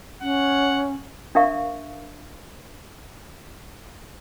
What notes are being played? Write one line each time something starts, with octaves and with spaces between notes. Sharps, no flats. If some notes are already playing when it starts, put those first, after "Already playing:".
C#4 F#5
D4 A#4 E5 F5 C#6